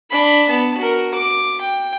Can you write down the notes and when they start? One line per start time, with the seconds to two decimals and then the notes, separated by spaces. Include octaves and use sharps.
0.11 D4 B5
0.47 B3 A5
0.77 F#4 A#4
1.14 D6
1.61 G5